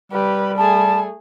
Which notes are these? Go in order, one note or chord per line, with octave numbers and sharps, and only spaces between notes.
G3 G4 B4
A3 G#4 A5